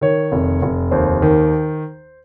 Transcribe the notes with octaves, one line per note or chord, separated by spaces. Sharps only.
D#3 C#5
F1
F1
D#2 C5
D#3